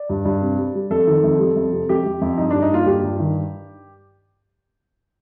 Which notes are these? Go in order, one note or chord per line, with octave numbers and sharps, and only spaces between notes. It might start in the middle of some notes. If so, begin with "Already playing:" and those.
Already playing: D5
G2
G2
C3
G3
G3
F2 A4
D#3
F2
G3
F2
C3
F2 G4
F2
F2
G2 D#4
G2 D4
D#4
A#3 F4
G2 G4
G2
D#3